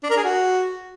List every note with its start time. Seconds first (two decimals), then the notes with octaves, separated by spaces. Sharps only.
0.03 D4
0.10 A#4
0.17 G#4
0.24 F#4